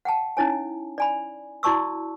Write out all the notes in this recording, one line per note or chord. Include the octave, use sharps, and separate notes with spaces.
F#5 G5 A5
C#4 D#4 E4 C#5 G#5
D5 G#5 B5
E4 F#4 D5 A5 C#6 E6